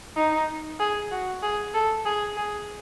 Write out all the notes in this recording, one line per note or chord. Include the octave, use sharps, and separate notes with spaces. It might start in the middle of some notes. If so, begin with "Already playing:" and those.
D#4
G#4
F#4
G#4
A4
G#4
G#4